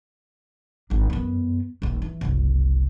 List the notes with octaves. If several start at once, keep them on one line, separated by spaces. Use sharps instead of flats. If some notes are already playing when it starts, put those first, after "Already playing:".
G#1 D4
F#2 B3
D#1 A#1
E3
F#1 C2